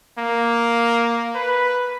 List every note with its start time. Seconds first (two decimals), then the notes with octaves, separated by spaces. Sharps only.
0.18 A#3
1.35 B4